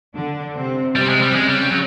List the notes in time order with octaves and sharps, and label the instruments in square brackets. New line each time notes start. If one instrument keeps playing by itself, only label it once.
[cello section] D3 D4
C3 C4
[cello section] C3 C4 [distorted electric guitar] G3
[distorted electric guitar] G#3
G3
[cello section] C#3 C#4 [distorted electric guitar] G#3
[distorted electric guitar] G3
F#3